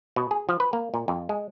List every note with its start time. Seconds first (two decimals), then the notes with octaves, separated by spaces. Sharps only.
0.16 B2
0.31 G#4
0.49 F3
0.60 B4
0.73 A#3
0.94 A#2
1.08 F2
1.29 G#3